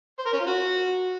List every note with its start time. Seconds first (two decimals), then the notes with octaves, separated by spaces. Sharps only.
0.19 C5
0.26 A#4
0.33 C#4
0.40 F4
0.47 F#4